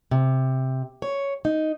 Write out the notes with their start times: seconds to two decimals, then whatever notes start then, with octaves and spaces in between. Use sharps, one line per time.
0.11 C3
1.02 C#5
1.45 D#4